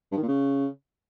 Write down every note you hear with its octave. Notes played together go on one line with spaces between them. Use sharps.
G2
D#3
A#2
C#3